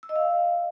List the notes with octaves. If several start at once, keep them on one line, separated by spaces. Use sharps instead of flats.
E6
D#5
F5